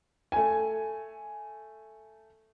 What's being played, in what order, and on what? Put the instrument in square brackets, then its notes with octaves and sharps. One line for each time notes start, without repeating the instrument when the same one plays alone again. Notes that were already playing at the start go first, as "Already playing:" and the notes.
[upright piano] A3 G#5